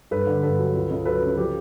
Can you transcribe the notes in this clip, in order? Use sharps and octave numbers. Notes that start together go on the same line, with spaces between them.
G2 A4 B4
D3
G2 A4 B4
F#3
C#2
C#2
F#3 A4 B4
C#3
F3 G4 A4